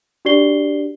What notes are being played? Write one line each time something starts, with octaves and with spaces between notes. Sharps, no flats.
D4 F#4 G4 D5 C7 G7